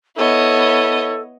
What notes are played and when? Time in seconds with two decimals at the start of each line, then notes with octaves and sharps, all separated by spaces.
0.16 B3 E4 A4 C#5 D#5